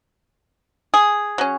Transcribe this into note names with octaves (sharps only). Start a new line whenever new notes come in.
G#4
F#3 C#4